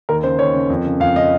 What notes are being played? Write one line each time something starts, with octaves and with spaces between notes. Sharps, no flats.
D#2 A#4
C#3 C5
D#2 C#5
C#3
F2
C#3
F2 F5
C#3 D#5